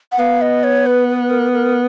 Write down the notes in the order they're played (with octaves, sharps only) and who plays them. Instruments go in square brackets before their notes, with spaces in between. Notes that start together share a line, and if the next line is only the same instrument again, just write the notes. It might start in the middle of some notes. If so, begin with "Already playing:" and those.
[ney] F#5
[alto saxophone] B3 [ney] F5
[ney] D#5
C#5
B4
B4
A#4
A#4